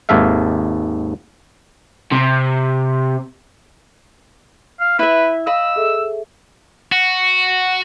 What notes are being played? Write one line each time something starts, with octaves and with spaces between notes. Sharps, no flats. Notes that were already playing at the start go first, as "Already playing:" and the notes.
G#1 D#2 G#2 A4 E5 F5
C3
F5
E4 B4 E5
D#5 F5 B5 E6
G#4 A4 E5
F#4